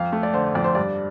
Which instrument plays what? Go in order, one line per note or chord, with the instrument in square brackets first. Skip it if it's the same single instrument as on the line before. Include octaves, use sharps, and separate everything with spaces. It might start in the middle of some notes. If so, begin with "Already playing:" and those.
Already playing: [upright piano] F2 F5
A3
D5
D3 C5
F2 D5
C5
G2 D5